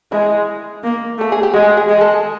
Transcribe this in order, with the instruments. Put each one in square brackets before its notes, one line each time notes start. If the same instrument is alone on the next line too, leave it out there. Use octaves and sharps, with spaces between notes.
[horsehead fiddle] G#3 [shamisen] E4
[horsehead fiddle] A#3
[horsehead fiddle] A3 [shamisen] A4
[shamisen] G#4
G4
[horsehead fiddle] G#3 [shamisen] F#4
[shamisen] G#4
[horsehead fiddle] G#3
[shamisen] A4